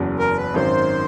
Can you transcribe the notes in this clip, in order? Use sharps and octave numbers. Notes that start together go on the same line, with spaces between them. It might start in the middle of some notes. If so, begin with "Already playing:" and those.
Already playing: F#1 E2 C#3 F#3
A#4
B4
G#1 F#2 D#3 C5